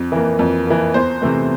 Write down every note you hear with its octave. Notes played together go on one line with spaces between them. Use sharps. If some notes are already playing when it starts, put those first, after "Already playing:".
Already playing: F2
E3 A#3
F2
E3 A#3
E2 C5
C3 E3 A3